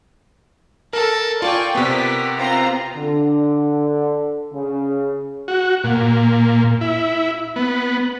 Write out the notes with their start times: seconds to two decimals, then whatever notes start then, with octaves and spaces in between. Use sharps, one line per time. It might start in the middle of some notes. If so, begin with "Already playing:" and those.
0.93 A4 A#4
1.42 F4 D5 G5 G#5 C#6
1.75 C3 B3 G4 A#4 B6
2.36 C4 F4 A#5
2.95 D3
4.53 C#3
5.48 F#4
5.84 A#2
6.81 E4
7.56 B3